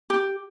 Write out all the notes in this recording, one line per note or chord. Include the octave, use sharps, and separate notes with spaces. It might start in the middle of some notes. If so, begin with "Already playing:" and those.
G4